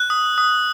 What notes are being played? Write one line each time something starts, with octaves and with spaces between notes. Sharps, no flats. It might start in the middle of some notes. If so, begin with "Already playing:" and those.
Already playing: F#6
D#6
D#6